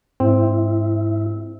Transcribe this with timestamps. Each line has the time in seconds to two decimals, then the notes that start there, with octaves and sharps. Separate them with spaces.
0.20 G#2 C4 E4